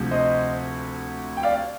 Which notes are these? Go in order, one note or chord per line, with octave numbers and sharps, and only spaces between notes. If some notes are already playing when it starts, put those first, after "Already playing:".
Already playing: D2 C3 F3
C5 D#5
G5
D5 F5